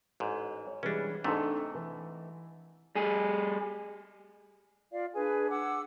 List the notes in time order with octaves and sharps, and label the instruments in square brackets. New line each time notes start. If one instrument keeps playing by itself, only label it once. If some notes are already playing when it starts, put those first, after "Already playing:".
[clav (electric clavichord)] A1 G#2
[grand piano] C#5
[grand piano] E3 G3 G#3 [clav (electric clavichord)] C#4 D4
[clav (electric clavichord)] G#2 C3 A3 [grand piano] D4 D#4 A4
[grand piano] E3
[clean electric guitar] G3 G#4
[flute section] F4 D5 F5
D4 G#4 B4 G#5
F#5 D6 E6